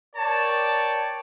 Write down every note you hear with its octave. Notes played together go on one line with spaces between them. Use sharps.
A#4 C#5 D5 G5 A5